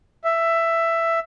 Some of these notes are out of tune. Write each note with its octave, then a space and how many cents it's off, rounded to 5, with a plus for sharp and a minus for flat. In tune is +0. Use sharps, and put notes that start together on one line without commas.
E5 +10